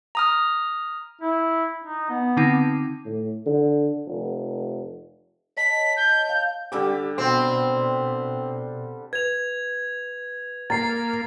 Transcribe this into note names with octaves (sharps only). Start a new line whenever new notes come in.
A#5 D#6 F6
E4
D#4
B3
D3 C4 D#4
A2
D3
F1
C#5 D#5 A5 B6
G6
F5
D3 G3 G4 D6
B2 C4
B4 G#6 F7
A#3 A#5 A6 C7